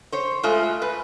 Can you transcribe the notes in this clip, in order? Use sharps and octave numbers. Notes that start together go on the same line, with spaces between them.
C5 C#5
G#3 A3 F4
B4